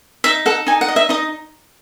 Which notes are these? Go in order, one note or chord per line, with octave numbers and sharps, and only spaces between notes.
D#4 E5
A4 F#5
D#4 G#5
F#5
D#5
E5
D#4 D#5